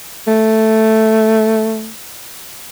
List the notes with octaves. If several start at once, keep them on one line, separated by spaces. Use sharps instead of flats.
A3